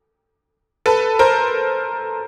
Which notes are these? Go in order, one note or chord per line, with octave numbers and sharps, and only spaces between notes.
A4 B4
A#4 C5